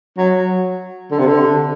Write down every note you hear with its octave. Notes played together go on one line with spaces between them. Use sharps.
F#3
D3
C3
D3